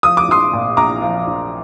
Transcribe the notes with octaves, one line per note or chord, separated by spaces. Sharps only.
F3 D#6
D6
A#1 C6 D#6
A#2
A#1 A#5 D6
F3
A#1